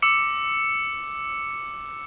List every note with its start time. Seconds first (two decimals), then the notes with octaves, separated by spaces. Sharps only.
0.02 D6 E6 C#7